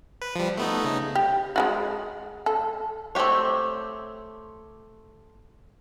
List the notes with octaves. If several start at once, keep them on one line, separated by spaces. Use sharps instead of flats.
B4
F3 G3
A3 B3 D#4
C#3 D#4
G4
G#3 F4 F#4
A4
A3 C4 F4 G4 C#5